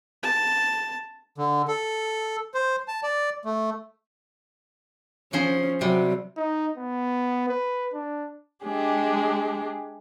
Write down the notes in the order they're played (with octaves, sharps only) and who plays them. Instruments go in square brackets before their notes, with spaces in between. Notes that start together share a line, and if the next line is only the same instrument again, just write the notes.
[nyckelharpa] A5
[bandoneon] D3
A4
C5
A5
D5
A3
[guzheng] F3 G#4 C5 [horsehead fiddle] C#4
[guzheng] C3 G3 [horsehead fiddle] F#3
[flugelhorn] D#4
B3
B4
D4
[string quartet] G#3 D4 G4 G#4